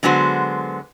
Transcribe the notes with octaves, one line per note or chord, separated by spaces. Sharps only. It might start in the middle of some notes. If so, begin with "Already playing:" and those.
D3 F#3 G#3 B3 F#4 C5